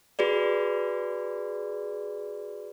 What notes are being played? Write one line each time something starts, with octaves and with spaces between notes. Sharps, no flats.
F#4 G#4 B4 D5